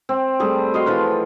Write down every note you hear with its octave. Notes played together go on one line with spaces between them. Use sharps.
C4
G3 A3 G#4
F#4 D#5 F5 C6
E3 F3 F4 B4